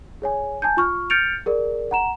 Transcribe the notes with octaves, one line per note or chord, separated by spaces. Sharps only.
G#4 C#5 G#5
G#5 A5 G6
F4 C#6 F6
F6 G6 A6 C#7 D7 F7
G#4 A#4 D5
F#5 A#5 E7